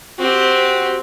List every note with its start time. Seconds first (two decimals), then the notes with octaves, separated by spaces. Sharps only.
0.18 C4 F#4 G4